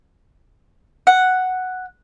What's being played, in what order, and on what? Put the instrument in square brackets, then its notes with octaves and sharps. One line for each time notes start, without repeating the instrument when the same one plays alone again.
[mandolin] F#5